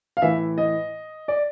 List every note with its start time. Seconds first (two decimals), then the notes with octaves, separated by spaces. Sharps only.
0.17 F5
0.22 A2 E3 E5
0.58 D#5
1.28 D5